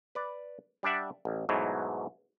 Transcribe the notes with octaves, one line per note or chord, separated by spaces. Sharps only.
B4 D5
G3 D4 D5 E5 F#5
A1
G#2 B2 E3 F#3 A3